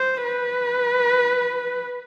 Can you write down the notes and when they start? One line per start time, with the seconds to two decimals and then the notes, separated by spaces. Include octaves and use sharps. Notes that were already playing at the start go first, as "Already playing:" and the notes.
Already playing: C5
0.24 B4